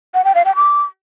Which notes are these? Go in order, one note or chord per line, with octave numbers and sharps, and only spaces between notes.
F#5
G5
F5
G5
D6